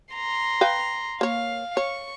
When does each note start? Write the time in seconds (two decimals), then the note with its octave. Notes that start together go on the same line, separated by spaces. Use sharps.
0.14 A#5 C6
0.61 B4 F5 G5
1.21 A#3 C#5 F5
1.77 C#5 C#6